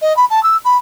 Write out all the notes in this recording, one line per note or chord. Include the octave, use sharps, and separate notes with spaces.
D#5
B5
A5
E6
B5